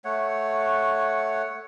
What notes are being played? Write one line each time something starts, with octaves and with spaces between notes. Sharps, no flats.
A3 C#5 F#5